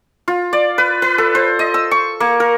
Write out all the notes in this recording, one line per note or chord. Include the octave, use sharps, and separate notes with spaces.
F4
D5
B4
B4
A4
C5
D#5
E6
C#6
A#3
A#4